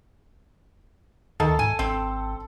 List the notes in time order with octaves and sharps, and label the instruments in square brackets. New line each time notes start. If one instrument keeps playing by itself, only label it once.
[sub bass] D2 [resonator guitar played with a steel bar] D#3 [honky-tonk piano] A4
[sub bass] G#2 [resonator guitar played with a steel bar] G#5
[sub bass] G#1 [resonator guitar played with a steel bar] C4